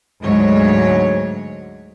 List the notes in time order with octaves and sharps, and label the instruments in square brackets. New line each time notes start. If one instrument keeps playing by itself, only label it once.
[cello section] D2 G#2 F#3 C#5